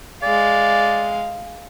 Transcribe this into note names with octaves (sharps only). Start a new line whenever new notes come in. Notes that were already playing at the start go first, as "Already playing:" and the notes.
G#3 D5 F5